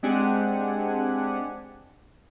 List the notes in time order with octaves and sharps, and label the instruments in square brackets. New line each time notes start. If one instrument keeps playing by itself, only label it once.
[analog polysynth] G#3 C4 D4 G4 F#5 G#5